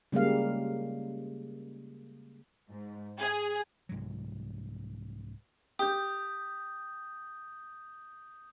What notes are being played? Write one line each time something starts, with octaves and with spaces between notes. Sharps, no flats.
C#3 G3 G#3 A#3 F5
G#2
G#4
C2 G#2 F#3
G4 D#6 G6